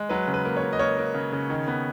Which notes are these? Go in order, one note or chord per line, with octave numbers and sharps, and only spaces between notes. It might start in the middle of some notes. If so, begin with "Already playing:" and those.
Already playing: G#3
F#3 B4
C#3
B4
A#3
C#5
C#3
D#5
A#3 C#5
A#3
C#3
C#3
D#3
B3